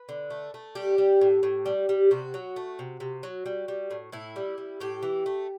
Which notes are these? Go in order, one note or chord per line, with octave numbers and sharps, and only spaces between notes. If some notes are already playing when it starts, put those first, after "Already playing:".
Already playing: B4
D3
A3
A3
G3 G4
G3
A2
A2
G3
G3
C3 F#4
F#3
A3
C3
C3
F#3
G3
G3
A2
A2 E4
G3
G3
A2 G4
E3
A3